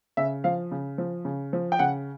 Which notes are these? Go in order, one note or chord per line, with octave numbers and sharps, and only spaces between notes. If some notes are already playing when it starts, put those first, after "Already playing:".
C#3 E5
F3 F5
C#3
F3
C#3
F3
G5
C#3 F#5